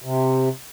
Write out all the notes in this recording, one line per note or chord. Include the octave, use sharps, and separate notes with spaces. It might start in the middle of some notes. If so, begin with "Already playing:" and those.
C3